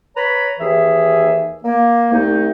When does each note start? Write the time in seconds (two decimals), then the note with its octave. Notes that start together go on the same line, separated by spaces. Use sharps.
0.17 B4 C#5 A#5 B5
0.59 D#2 E3 G#4 E5
1.63 A#3
2.12 C2 A3 D#4